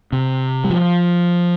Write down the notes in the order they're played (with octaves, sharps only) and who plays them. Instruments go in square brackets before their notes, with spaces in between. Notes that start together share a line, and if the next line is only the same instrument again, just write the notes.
[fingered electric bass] C3
G3
F3